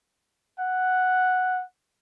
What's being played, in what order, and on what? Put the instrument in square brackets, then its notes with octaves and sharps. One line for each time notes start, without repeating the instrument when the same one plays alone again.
[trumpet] F#5